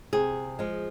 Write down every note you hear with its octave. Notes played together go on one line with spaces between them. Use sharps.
C3 G#4
F3 G#3